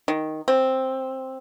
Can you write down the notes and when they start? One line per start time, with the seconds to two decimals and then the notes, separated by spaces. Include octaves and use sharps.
0.08 D#3
0.48 C4